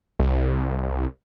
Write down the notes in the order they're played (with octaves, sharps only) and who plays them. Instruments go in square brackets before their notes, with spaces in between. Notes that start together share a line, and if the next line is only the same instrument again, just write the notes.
[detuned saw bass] C2